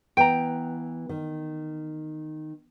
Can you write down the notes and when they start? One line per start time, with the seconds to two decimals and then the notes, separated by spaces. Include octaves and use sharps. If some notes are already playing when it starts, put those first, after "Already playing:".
0.17 E3 B3 G5 A#5
1.09 D#3